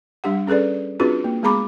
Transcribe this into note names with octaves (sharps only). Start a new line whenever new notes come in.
G3 D4 G4 F#5
C#4 G#4 A4 B4 D5
C4 D4 F4 F#4 G#4 B4
A#3
G#3 B3 G#4 A#5 B5 D6